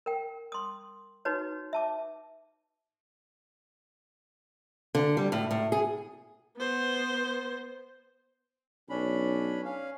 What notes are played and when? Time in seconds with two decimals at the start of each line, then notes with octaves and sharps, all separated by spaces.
0.06 A#4 G5
0.52 C6 D#6
1.25 D#4 F#4 B4 C#5
1.73 E5 A5 D6
4.95 D3
5.17 G3
5.32 A2
5.51 A2
5.72 G#4
6.57 B3 C5
8.90 B1 C#4 D4 B5
9.65 C#4 F5